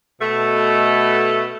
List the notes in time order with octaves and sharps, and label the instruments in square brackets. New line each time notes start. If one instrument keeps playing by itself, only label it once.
[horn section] B2 A3